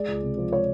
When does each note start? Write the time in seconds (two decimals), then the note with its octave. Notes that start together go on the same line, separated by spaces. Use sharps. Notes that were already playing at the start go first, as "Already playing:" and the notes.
Already playing: G#3 D5
0.08 C#2
0.23 C3
0.37 F3
0.52 G#3 C#5